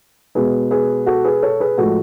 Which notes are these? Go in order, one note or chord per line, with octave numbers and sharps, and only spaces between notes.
B2 G#3 G#4 B4
G#4 B4
F#4 A4
G#4 B4
A4 C#5
G#4 B4
A2 F3 G#3 F#4 A4